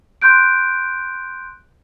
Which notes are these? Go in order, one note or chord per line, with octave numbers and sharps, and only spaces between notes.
C6 F#6 G6 D7